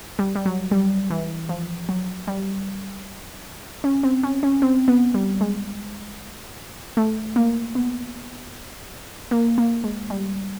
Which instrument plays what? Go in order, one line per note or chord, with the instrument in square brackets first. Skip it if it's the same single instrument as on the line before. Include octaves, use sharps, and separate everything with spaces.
[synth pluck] G3
G3
F#3
G3
E3
F3
F#3
G3
C#4
C4
C#4
C#4
C4
B3
G3
G#3
A3
A#3
B3
A#3
A#3
G#3
G3